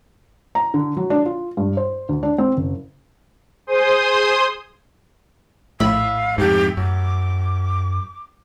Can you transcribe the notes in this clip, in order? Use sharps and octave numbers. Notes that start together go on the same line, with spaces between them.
A#5
D3
F#3
D4
F4
G2
C5
D2
D4
C4
F#1
G#4 C5 C6 D#6
A#1 A2 E5 F5 B5
F2 G#2 G4
F#2 D6